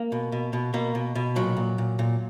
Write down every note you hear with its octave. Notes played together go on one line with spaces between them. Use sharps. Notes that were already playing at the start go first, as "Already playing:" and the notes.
Already playing: A#3
B2
B2
B2
B2 A#3
B2
B2
A#2 F#3
A#2
A#2
A#2